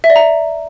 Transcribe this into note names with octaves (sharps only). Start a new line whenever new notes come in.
E5
D5
A#5